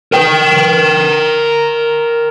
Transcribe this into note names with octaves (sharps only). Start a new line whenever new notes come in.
A#4 G5